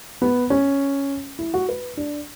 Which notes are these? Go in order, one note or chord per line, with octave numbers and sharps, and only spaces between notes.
B3
C#4
E4
F#4
B4
D4